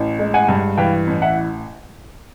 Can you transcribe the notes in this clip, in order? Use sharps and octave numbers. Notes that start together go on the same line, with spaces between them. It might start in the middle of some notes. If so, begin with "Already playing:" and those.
Already playing: A1
G#3
F#5 G#5
G2
E3 F5 G5
A1
E5 F#5